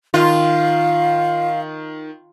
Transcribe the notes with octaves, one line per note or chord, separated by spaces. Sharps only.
D#3 F4 F5